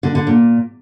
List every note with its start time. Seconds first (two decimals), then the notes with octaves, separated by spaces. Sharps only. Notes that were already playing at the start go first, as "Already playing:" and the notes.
0.03 D3
0.15 D3
0.27 A#2